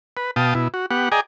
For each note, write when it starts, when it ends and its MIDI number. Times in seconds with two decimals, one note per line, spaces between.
0.17 0.31 71
0.36 0.54 47
0.36 0.54 77
0.36 0.54 79
0.36 0.54 81
0.36 0.54 87
0.55 0.68 47
0.55 0.68 64
0.74 0.86 66
0.91 1.09 59
0.91 1.09 67
0.91 1.09 78
1.12 1.21 68
1.12 1.21 74
1.12 1.21 75
1.12 1.21 79
1.12 1.21 80
1.12 1.21 82